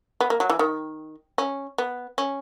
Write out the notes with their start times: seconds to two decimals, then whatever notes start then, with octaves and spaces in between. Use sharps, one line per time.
0.21 B3
0.30 A#3
0.40 F#3
0.50 E3
0.59 D#3
1.38 C#4
1.78 B3
2.18 C#4